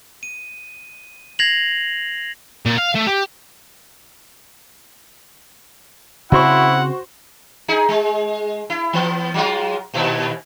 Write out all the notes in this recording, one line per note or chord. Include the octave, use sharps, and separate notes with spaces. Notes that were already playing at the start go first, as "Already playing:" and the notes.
D#7
G#6 A#6 C7 F7 F#7
A#2
F5
A3
G4
C#3 C4 E4 F#4 C5 F#5 C#6
D#4 G#4
G#3
E4
E3 B3
F#3 G#3 F4
D#2 A#2 E4